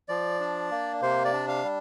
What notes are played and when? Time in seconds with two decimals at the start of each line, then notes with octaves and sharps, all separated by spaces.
0.09 F3 D5
0.40 D4
0.71 A#3
1.02 C3 C5
1.25 D5
1.33 D4
1.48 F5
1.64 G3